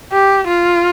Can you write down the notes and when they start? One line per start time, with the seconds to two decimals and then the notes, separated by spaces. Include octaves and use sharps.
0.12 G4
0.47 F4